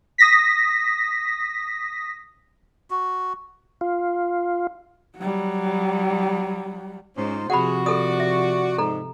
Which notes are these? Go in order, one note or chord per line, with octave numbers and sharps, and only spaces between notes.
D#6 A#6 B6
F#4
F4
F#3 G3
G#2 C#4 D#4 F4 C5
C3 F3 F#4 G#4 F#5 B5
G#4 A4 D5 D#6
E5
G#2 A4 A#5